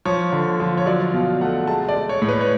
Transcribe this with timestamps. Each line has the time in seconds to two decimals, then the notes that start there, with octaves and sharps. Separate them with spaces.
0.05 F3 C#5
0.32 D3
0.60 F3
0.77 C#5
0.86 F#3 D5
1.14 B2 F5
1.41 A3 F#5
1.67 G#3 A5
1.89 D5
1.95 G#3
2.09 C#5
2.22 A2
2.29 B4
2.41 C#5